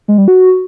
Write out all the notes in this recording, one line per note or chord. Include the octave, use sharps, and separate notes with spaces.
G#3
G3
F#4